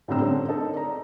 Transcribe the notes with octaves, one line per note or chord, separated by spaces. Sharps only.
A2 D3 G3 C4 A#5 E6
C4 C#4 A4 C5
D#4 A4 A#4
D5 A#5